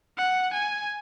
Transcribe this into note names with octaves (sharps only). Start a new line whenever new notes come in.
F#5
G#5